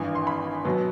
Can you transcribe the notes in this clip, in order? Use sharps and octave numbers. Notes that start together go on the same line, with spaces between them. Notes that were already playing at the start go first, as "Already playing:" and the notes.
Already playing: G#1 G2 E3 G#5
C6
B5
B2 F#3 B3